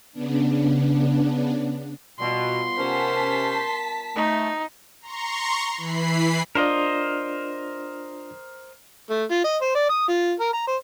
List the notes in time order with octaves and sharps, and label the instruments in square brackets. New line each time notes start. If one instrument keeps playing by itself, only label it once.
[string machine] C#3 B3 D4
[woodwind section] B2 [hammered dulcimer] G3 B3 F4 [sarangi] C6
[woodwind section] C3 C#4 C5 [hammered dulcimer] A#4 F#5 [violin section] A5 B6
[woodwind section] A3 [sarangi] D#4
[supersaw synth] A#5 C6 C#6
E3 B5 C7
[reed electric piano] D4 F4 D5 [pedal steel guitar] A#4 C5 D#5
[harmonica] A3
F4
D#5
C5
D5
D#6
F4
A#4
A#5
C5